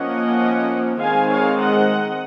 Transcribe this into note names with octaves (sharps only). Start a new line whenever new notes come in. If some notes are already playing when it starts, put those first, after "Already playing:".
Already playing: F3 A#3 C#4 D#5 F#5
D#3 G#3 C4 F5 G#5
C#5 F5
D#5 F#5